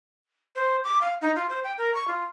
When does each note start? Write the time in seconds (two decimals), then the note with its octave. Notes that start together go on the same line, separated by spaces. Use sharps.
0.55 C5
0.84 D6
1.01 F5
1.21 D#4
1.36 F4
1.49 C5
1.64 G5
1.78 A#4
1.94 C#6
2.08 F4